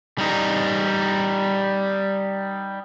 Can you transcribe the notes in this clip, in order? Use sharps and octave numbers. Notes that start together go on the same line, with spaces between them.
G3 D#4